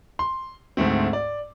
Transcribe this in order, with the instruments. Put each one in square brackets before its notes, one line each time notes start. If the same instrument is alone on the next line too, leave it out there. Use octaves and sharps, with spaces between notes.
[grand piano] C6
D2 G#2 A3 C4
D5